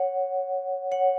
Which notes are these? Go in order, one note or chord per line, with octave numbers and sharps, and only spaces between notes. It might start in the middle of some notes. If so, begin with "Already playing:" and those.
Already playing: C#5 F#5
C#5 F#5